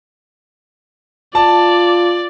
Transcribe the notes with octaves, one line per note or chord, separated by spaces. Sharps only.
F4 D5 A5